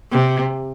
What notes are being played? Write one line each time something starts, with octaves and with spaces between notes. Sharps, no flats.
C3